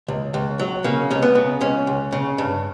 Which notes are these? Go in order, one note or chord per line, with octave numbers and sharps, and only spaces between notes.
C#2
C#2
F#3
C#3 A#3
C#2 C#4
B3
C#3
C#2 C#4
C#2
C#3
G2